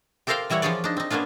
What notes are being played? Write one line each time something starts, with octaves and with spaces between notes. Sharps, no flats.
G4 A4 A#4 C5 F5 G5
E3 G3 E4 C#5 F#5
F3 F4 G4 G#4 C#5 D5
D4 D#4
C4 D#4
A#3 B3 C#4 D4 F4